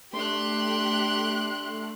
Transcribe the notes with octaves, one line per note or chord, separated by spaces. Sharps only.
A3 D4 G4 C6 F#6